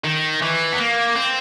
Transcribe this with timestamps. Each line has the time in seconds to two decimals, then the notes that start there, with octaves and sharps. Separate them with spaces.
0.04 D#3
0.42 E3
0.73 B3
0.79 A#3
1.16 C4